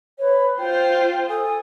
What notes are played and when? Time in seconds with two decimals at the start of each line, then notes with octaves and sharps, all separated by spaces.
0.18 B4 C#5
0.59 F4 C5 G5
1.27 A4 G#5 D#6